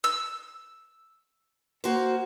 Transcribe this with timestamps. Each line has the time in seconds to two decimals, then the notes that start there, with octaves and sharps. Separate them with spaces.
0.04 E6
1.84 A#3 F#4 C5